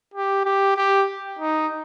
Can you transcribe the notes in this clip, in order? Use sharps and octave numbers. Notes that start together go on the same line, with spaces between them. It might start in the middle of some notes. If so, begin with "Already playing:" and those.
G4
G4
G4
D#4